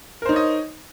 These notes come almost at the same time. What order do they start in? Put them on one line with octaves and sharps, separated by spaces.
A#4 C5 D#4 C#5 D#5